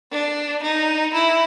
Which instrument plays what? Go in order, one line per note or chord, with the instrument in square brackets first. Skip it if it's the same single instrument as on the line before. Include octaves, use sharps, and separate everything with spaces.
[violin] D4
D#4
E4